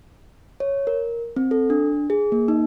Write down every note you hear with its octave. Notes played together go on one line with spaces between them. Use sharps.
C#5
A#4
C4
A4
D4
G#4
A#3
D#4